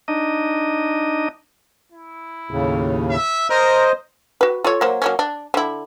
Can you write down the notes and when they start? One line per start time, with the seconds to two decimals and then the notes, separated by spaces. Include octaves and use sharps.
0.08 D4 D#4 D#5
1.92 E4
2.51 D#2 A2 C#3
3.10 E5
3.50 A#4 C5 D#5
4.41 F#4 B4
4.64 F4 A4 C#5
4.81 F#3 A#3 C5
5.02 F#3 A#3 C#4
5.19 D4
5.54 D3 E4